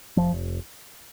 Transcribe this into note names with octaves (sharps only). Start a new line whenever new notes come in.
F1 F3
F1